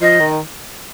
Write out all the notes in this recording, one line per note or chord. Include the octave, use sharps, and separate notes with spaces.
F3 D#5
D#3